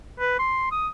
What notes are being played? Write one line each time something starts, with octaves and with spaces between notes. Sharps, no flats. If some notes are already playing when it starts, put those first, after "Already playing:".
B4
C6
D#6